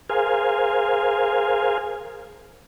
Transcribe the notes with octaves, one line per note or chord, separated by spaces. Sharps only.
G#4 A#4 C5 F5 G#5